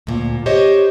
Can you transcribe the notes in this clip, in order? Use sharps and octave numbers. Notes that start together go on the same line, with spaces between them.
D2 A#2
G4 C5 C#5 D#5